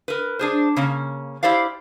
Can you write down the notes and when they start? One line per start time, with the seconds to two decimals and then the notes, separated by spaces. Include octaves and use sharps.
0.08 A#4 B4
0.39 D4 G#4 C5
0.76 C#3 A#3 C#4
1.43 E4 G4 C5 D5 F5